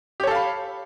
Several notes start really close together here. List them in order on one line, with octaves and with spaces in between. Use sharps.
G4 C#5 A4 F5 B5